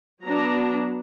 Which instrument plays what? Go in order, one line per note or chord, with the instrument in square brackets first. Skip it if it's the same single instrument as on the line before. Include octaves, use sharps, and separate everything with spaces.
[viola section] F#3 B3 D4 A#5